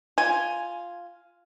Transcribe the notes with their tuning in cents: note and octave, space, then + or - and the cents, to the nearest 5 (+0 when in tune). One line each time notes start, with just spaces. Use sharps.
F4 +0 G#5 +0